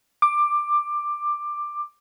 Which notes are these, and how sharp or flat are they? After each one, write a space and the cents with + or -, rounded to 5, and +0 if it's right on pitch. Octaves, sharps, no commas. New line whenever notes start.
D6 +15